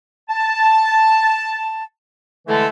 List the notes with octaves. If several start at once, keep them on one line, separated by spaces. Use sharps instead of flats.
A5
D3 E3 G#3 A3 E4 A4